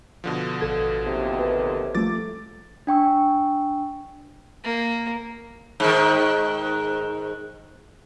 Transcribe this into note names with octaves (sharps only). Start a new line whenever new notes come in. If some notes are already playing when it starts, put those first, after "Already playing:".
B2 D3 F3
A1 A4 G#6
D#2 C3
B4
F3 A3 D6 A6
D4 G5 C#6 E6
A#3
G#2 D#3